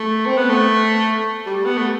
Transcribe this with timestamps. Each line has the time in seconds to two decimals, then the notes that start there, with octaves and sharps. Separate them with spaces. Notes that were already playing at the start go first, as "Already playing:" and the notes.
Already playing: A3
0.26 C4
0.38 B3
0.50 A3
1.46 G3
1.65 B3
1.77 A3